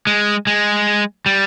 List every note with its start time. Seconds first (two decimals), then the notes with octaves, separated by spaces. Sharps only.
0.07 G#3
0.47 G#3
1.26 G3